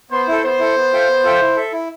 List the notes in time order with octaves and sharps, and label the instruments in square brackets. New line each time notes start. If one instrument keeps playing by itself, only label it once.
[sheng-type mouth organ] B3 [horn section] C5
[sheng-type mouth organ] E4 A4
[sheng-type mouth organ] B3 [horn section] C5
[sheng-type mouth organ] E4 A4
B3
F4 A4 E5 G5
B3
F4 A4 E5 G5
E4
A4 E5
E4